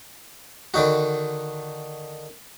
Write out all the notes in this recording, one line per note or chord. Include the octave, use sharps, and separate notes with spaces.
D3 D#3 D#4 F#4